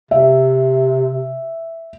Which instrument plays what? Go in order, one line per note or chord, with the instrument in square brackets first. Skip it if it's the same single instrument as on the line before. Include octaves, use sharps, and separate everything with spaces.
[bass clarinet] C3 [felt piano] E5